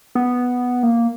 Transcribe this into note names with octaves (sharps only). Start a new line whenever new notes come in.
B3
A#3